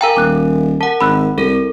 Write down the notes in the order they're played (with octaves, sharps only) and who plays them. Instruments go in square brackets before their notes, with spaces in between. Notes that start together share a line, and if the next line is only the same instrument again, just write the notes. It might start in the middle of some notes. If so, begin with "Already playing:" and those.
[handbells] A#4 F5 G#5 [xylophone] G5 A#5 E6
[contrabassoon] D#1 [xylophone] D6 F#6
[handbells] A#4 F#5 [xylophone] A5
[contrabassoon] G#1 [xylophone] B5 E6 F#6
[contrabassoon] C2 [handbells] A4 A#4